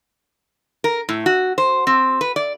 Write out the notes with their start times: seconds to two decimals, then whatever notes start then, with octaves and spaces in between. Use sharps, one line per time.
0.84 A#4
1.09 A2
1.26 F#4
1.58 C5
1.87 C4
2.21 B4
2.36 D5